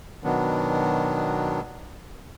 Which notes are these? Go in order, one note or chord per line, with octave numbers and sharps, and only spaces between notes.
B2 D#3 F#3 B3 D4